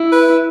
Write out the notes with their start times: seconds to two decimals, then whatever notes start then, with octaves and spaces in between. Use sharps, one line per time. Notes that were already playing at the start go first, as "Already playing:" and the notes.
Already playing: E4
0.12 B4